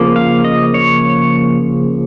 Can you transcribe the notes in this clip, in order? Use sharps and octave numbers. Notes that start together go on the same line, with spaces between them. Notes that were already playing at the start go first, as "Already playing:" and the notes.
Already playing: C#3 F3 A#3
F5
D#5
C#5